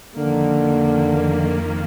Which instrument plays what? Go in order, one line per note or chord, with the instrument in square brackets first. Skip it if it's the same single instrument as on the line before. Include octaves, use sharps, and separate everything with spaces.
[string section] F2 D#3 A#3 [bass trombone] D3